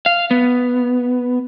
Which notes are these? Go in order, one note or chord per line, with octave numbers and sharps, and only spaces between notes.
F5
B3